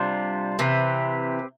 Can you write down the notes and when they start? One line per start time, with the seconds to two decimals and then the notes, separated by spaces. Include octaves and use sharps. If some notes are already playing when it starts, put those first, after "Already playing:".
Already playing: C3 G3 D4 F4 C5
0.59 C3 E3 C4 G4 B4